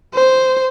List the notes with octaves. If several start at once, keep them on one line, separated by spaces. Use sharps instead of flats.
C5